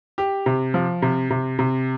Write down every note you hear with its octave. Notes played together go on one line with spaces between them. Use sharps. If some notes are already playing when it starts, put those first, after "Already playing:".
G4
C3
F3
C3
C3
C3